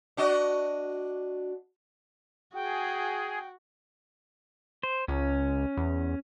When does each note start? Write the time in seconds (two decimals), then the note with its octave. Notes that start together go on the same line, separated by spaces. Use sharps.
0.17 D4 F#4 D#5
2.55 F#4 G#4 G5
4.83 C5
5.08 C#2 C#4
5.77 E2